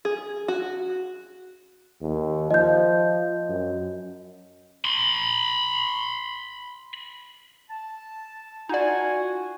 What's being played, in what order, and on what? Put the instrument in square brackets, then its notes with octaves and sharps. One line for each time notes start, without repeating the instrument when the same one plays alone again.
[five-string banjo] G#4
F#4
[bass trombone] D#2
[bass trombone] F3 [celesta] D#5 G6
[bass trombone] F#2
[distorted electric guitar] B5 C6
[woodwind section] A5
[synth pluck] D#4 D5 [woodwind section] F4 [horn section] F#4 G#5